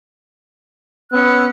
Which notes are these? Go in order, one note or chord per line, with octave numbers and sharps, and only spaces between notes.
B3 C#4 E6 F#6